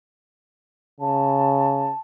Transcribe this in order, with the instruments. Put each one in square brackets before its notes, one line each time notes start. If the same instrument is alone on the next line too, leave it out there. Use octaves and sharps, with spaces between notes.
[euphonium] C#3 [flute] A5